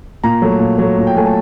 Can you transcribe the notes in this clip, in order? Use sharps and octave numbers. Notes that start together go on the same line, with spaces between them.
A#2 A#5
F#3 A3
A#2
F#3 A3
A#2
G5
F#3 A3 G#5
A5